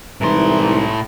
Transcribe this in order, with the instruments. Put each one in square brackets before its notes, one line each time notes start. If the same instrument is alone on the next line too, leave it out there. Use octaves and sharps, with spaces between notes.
[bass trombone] C2 [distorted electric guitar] A2 C6 [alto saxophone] E3 [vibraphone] G#3 D#4 A#5